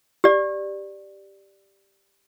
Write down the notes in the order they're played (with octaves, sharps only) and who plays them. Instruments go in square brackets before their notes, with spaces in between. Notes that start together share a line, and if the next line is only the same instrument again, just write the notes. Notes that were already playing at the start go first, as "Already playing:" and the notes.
[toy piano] G4 D5